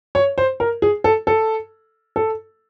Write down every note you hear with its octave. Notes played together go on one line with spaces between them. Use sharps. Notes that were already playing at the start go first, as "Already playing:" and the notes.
C#5
C5
A#4
G#4
A4
A4
A4